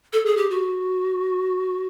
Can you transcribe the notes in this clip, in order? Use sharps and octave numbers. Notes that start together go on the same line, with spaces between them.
A4
G#4
G4
F#4